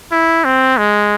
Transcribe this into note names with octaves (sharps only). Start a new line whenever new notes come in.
E4
C4
G#3